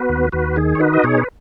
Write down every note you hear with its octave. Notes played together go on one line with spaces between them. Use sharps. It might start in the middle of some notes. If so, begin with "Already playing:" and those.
Already playing: B3 F#4 B4
D#2
D#2 F#4 B4
D#3 G#4
C#5
D#4 F#4 B4
D#5
B2 G#4 C#5
B4